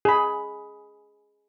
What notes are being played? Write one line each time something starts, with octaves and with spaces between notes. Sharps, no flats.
G#4 B5